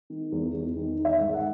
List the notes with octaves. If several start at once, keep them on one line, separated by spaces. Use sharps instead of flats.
D#3
E2
E2
D#3
D#3
E5
G#2
F#5